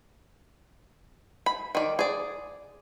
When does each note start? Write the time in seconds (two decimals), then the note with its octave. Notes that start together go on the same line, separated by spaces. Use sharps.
1.46 B5
1.75 D#3 D5
1.99 G#4 D5